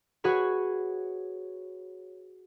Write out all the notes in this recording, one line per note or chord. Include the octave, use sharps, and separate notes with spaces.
F#4 G#4 B4 C#5 B5